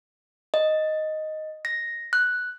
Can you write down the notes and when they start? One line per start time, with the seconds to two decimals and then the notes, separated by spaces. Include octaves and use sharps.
0.54 D#5
1.65 A#6
2.13 F#6